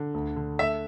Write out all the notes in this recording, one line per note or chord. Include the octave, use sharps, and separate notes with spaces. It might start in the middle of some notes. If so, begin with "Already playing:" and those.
Already playing: D3
D2
D3
A3 E5